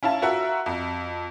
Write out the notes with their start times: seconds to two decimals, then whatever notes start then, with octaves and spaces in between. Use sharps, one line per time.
0.03 C#4 E4 F5 A5
0.22 F4 F#4 A#4 E5 F#5
0.66 F2